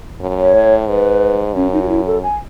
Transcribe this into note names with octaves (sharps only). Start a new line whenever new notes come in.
F#2
C#5
A2
G#2 B4
F#2 C#4
D#4
F#4
E4
A4
G#5